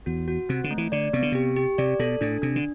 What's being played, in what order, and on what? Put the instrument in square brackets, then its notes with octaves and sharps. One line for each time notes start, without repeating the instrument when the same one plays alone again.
[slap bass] E2 [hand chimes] F#4
[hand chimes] F#4
[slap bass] C3 [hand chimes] C4
[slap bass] D3
[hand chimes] A3
[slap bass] E3
[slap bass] D3 [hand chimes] D5
[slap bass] C3 [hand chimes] B3
[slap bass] D3
[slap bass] C3 [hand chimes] G4
[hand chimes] G4
[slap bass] C3 [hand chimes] D5
[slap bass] B2 [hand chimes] A4
[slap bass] A2 [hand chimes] D4
[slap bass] C3 [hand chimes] D4
[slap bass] D3